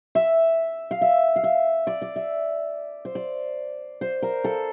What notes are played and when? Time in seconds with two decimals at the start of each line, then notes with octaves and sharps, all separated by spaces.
0.15 E5
0.91 F5
1.01 E5
1.36 F5
1.44 E5
1.87 D5
2.02 D5
2.16 E5
3.05 C5
3.15 D5
4.01 C5
4.22 A#4
4.44 A4